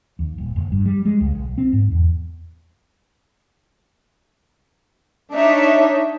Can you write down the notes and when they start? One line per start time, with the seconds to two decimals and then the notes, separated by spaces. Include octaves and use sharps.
0.19 D#2
0.38 D#1
0.56 F#1
0.72 G2
0.85 G3
1.05 G#3
1.21 C#2
1.35 B1
1.58 C4
1.73 G#2
1.91 E2
5.34 D4 D#4 C#5 E5